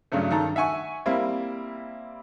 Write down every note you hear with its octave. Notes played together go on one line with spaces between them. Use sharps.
G2 C#3 F#3 A3
G2 D#3 A4 A#5
E5 F#5 G#5 C#6
G3 A#3 C4 E4